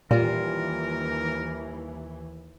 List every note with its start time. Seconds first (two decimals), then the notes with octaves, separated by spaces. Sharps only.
0.11 D#2 A#2 E3 G3 F4 A#4